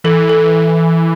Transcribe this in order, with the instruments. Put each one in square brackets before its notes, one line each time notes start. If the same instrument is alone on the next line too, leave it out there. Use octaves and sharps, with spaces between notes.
[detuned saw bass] E3 [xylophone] A4
[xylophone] A4